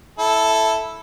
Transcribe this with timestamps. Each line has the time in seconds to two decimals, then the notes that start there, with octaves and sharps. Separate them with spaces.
0.19 E4 A4